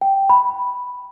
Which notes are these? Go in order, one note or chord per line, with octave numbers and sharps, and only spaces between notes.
G5
B5